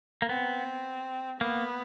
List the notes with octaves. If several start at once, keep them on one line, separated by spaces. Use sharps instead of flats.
A#3
B3 C4
A#3 B3